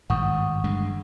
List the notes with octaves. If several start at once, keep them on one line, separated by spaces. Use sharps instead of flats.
G#1 G2 F#5 C#6 D#6
G2 D3 G#3